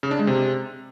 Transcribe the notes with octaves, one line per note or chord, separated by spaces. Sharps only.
C#3
D4
G#3
C3